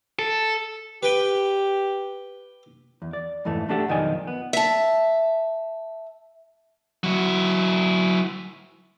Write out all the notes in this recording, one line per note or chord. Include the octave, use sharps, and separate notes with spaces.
A4
G4 B4 G5
E2
D5
F2 G#2 E3 A3
A3 D4 G4 A4 F#5
B1 F2 D#3 F3 D5 G#5
B3
E5 A5
F#3 E4